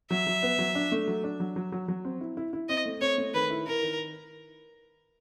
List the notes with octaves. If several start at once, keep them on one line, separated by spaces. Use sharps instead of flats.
F#3 E5
F#3
B3
F#3
D4
A3
F#3
D4
F#3
F#3
F#3
F#3
C4
E4
E4
E4
C4 D#5
A3
C4 C#5
A3
D#3 B4
E4
E4 A#4
D#3